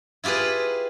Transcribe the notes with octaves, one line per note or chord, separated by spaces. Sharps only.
E4 F4 G4 G#4 B4